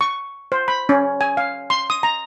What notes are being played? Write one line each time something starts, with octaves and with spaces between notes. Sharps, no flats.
C#6
C5
B5
C#4
G#5
F5
C6
D#6
A#5